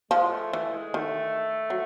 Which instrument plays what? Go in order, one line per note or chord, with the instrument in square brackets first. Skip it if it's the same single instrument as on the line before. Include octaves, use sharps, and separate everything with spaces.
[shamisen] F3 [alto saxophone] G#3
[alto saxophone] A3
[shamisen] E3 [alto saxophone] A3
[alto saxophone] G#3
[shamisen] D#3 [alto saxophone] A3
[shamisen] F#3